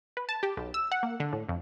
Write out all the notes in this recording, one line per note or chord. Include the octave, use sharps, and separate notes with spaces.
B4
A5
G4
B1
E6
F#5
A#3
D3
A2
F2